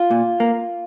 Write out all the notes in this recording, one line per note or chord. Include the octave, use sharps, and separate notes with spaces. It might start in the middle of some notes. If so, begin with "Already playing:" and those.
Already playing: F4
A#2
A#3